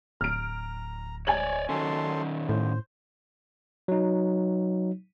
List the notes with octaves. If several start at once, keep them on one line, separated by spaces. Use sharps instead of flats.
D1 A#5 F6 D7
C#5 D5 G#5 G#6 F#7
D#3 F#3 C#4 A4 C6
A2 C5
F#3 D#4